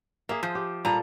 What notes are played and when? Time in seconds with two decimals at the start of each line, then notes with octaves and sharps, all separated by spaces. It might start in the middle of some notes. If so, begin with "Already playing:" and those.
0.29 A#3 G#4 E5
0.43 F3 C5
0.55 G4
0.85 A#2 G3 A4 A#5